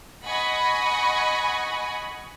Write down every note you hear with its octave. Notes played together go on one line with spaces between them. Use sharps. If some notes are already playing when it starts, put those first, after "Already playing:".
D#5 F#5 G#5 B5 C#6 D#6